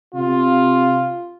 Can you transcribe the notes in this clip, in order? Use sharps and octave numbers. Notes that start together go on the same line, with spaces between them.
C3 F4